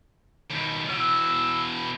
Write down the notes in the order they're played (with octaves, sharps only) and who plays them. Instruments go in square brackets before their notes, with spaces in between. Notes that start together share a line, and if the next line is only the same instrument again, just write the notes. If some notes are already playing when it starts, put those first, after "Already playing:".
[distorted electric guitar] D#2 B2
[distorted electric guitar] B2 E3 [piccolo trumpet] E6